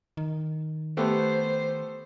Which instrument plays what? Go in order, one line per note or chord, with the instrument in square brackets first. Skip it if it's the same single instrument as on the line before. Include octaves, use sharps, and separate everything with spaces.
[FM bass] D#3
[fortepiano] A3 B3 G4 [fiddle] C5